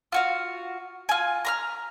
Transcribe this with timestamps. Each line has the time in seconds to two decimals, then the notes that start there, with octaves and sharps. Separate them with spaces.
0.12 F4 F#4 F5
1.09 F4 G#5
1.45 A#5 B5 F6